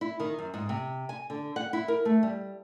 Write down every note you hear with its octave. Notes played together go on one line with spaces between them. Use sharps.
E4
D#3
F#2
G#2
C3
G#5
D3
F#5
E4
A#4
A3
G3